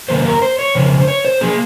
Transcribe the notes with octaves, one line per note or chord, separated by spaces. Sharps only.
F#2 D#3 A#3 C5
A#4
C5
C#5
F2 C#3 C5
C#5
C5
F3 A#3 G#4